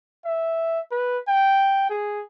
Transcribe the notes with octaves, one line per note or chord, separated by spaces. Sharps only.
E5
B4
G5
G#4